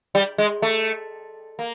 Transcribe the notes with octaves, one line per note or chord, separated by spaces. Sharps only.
G3
G#3
A3
A#3